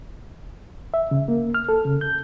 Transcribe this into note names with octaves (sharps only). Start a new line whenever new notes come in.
E5
C#3
A#3
F6
A4
C#3
G6